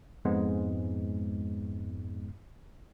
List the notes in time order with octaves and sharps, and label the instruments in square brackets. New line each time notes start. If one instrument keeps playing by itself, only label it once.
[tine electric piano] F2 G#2 G#3 B3